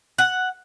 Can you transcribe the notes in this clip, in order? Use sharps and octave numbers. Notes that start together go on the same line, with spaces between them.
F#5